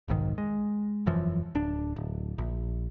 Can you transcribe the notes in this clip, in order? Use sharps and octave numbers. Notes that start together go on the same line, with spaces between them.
F1 B1 G#2 D#3
G#3
E1 F#2 E3 F3
D1 D4
D1
A#1